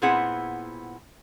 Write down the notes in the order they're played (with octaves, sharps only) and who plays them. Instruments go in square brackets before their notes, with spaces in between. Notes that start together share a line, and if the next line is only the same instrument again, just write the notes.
[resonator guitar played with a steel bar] A#2 B3 C4 E4 G#4 F#5